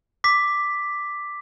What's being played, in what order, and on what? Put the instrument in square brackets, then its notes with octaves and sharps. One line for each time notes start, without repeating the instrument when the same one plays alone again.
[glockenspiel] D6 B6